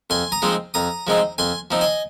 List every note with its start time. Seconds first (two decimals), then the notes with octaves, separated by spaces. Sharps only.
0.10 F2 G#5 C6
0.32 A#5 D#6
0.42 F3 G#3 C4 D#4
0.74 F2 A#5 D#6
1.07 F3 G#3 C4 D#4
1.38 F2 G#5 C6
1.71 F3 C4 D#4
1.81 D#5 G#5